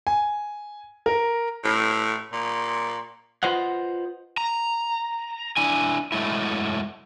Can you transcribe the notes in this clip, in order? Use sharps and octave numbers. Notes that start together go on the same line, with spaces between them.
G#5
A#4
A2
A#2
F4 B4 C5 D#5 F#5
A#5
D4 E4 G#5
F#3 G#3 A3 E4